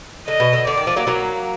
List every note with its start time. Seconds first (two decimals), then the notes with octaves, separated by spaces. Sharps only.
0.27 D3 D#5
0.40 B2
0.53 D3
0.67 D3 D5
0.77 D#3
0.87 F3
0.96 F#3 A#3
1.07 F#3 A#3